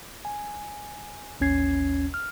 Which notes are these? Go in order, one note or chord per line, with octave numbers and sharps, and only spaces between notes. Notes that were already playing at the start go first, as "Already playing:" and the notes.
G#5
A1 D#2 C#4 G#6 C7
F6